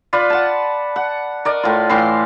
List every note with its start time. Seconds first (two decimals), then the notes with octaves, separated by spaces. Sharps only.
0.13 F4 B4 D5
0.30 F#5 A5
0.96 F#5
1.45 A#4 D5 D#5
1.63 A2 F4
1.89 A2 E3 F5 C6